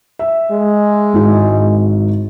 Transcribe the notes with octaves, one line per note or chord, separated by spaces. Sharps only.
E5
G#3
G#1 E4 F#4